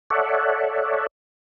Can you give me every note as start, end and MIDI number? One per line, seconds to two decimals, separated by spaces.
0.10 1.07 69
0.10 1.07 73
0.10 1.07 74
0.10 1.07 76
0.10 1.07 78